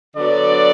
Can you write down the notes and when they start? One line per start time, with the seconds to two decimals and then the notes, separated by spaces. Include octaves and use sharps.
0.16 D3 F#3 B3 D5